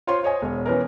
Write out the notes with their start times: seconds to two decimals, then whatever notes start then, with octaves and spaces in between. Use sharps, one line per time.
0.07 F4 C5 C#5 C6
0.23 C5 C#5 D#5 G#5
0.42 E1
0.66 E3 B3 C#4 A#4